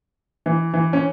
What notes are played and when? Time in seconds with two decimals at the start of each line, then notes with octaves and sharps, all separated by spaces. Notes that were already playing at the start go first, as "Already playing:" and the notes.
0.46 E3
0.74 E3
0.93 C#4